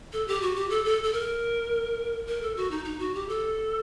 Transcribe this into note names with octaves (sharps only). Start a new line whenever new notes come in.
A4
G4
F#4
G4
A4
A4
A4
A#4
A#4
A4
F#4
D#4
D#4
F#4
G4
A4